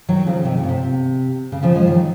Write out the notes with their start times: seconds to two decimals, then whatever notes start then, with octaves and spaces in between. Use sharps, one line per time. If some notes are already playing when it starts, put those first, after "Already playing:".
0.08 D#3 F#3
0.27 C#3 F3
0.45 C3 D#3
0.57 C#3
0.64 A#2
0.69 C3
1.52 C#3
1.63 C#3 F3
1.75 F3 G#3
1.87 D#3 F#3